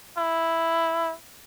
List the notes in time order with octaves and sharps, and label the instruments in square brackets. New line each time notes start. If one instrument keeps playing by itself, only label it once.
[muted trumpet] E4